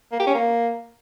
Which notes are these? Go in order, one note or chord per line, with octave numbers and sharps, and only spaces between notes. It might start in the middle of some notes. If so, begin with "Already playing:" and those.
A#3
G4
C#4
A#3